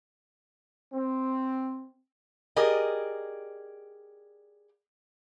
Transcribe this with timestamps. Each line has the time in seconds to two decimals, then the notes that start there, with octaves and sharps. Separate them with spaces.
0.94 C4
2.56 G4 G#4 A#4 D5 D#5